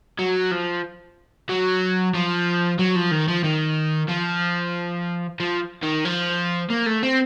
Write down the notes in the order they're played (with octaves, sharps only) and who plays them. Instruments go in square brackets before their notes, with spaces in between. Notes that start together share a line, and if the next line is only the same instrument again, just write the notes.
[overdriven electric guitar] F#3
F3
F#3
F3
F#3
F3
D#3
F3
D#3
F3
F3
D#3
F3
A#3
A3
C4